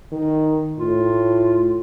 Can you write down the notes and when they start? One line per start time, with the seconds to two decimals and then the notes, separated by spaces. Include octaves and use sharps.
0.12 D#3
0.78 A2 F4